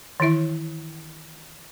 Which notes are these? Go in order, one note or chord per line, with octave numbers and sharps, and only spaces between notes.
D#3 E3 E4 E5